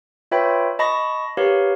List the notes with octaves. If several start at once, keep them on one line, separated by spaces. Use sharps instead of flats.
F4 B4 C#5 E5 G5 B5
D#5 A5 B5 C#6 A#6
G4 A#4 B4 C#5 F5